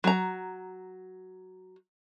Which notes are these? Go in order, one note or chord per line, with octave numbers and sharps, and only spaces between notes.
F#3 A#5